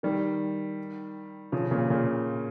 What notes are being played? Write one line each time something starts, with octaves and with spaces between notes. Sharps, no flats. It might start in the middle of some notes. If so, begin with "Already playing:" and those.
D#3 G3
C#3 F3
A#2 C#3
A#2 C#3